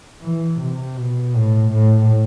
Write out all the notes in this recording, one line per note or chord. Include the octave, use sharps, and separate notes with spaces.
E3
C3
B2
A2
A2